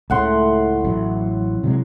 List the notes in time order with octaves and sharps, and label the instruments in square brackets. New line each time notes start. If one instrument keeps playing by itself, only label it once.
[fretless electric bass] C#2 C#3 [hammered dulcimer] A2 F#5 C6
[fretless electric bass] A1 F#3
C3 F#3 G#3